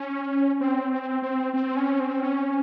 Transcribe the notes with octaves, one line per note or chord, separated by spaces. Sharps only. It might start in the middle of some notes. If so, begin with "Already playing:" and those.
Already playing: C#4
C4
C4
C4
C4
C#4
C4
C#4